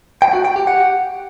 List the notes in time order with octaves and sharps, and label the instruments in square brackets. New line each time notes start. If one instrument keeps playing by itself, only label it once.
[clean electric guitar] G5
F#4
G5
G4
F#5